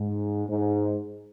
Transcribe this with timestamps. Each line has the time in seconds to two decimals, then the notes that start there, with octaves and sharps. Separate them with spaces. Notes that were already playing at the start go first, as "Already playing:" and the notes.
Already playing: G#2
0.48 G#2